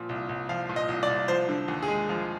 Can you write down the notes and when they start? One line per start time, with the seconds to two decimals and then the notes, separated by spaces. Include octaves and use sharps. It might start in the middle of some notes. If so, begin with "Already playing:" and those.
Already playing: A#2 F3
0.09 C2
0.29 C2
0.49 F3 F5
0.69 A#2
0.76 D#5
0.88 C2
1.03 D5
1.09 C2
1.28 F3 C5
1.49 D3
1.68 D#2
1.83 G#4
1.88 G#3
2.09 F3